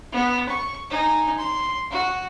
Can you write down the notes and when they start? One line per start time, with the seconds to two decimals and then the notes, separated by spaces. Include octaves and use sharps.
0.13 B3
0.49 C#6
0.90 D#4 G#5
1.38 C6
1.91 F#4